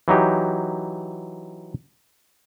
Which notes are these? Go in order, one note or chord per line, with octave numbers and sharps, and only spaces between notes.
E3 F#3 D#4 G4